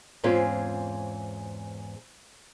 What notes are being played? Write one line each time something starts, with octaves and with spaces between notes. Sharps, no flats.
E2 G#2 C4 C#4 F4 G#4